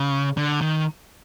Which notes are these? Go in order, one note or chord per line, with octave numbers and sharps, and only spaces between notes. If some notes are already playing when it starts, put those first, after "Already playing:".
Already playing: C#3
D3
D#3